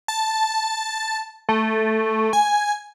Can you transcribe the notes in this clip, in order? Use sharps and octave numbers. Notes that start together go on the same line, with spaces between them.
A5
A3
G#5